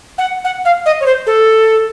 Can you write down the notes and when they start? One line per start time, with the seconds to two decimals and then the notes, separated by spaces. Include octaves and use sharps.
0.18 F#5
0.44 F#5
0.65 F5
0.86 D#5
1.01 C#5
1.06 C5
1.27 A4